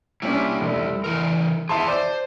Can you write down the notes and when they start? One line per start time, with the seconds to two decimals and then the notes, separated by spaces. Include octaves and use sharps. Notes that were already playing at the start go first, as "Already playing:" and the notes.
0.22 G3 A#3 C#4 D4 E4
0.61 F1
1.04 E3 A#4
1.69 E4 G#4 E5 A5 C6
1.88 C5 D5